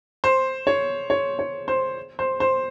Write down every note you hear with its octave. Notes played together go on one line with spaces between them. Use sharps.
C5
C#5
C#5
C#5
C5
C5
C5